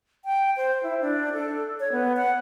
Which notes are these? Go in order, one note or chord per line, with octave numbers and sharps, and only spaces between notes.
G5
C5
E4
D4
A4
C#5
B3
F#5